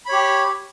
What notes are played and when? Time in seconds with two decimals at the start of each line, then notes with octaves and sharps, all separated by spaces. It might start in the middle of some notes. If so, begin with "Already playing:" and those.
0.06 B5
0.09 C#5
0.12 G4